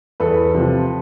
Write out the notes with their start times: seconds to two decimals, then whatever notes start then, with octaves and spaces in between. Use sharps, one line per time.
0.20 E2 A4 B4
0.55 C3 F3